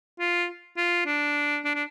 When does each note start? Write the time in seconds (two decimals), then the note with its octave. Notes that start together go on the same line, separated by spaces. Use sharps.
0.20 F4
0.77 F4
1.06 D4
1.65 D4
1.75 D4